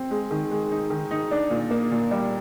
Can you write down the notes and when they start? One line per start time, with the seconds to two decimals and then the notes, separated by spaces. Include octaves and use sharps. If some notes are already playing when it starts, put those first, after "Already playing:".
Already playing: C4
0.11 G#3
0.31 D#3
0.51 G#3
0.71 D#4
0.90 D#3
1.11 D#4
1.31 D4
1.50 A#2
1.70 A#3
1.91 A#2
2.11 G3